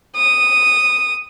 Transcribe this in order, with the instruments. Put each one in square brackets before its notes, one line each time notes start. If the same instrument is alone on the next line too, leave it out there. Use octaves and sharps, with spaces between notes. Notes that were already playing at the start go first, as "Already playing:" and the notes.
[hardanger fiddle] D#6